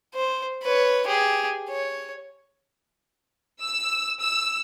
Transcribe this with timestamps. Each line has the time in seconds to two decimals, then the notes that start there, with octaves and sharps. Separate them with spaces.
0.14 C5
0.63 B4 C#5
1.07 G4 G#4
1.69 C#5
3.61 E6
4.20 E6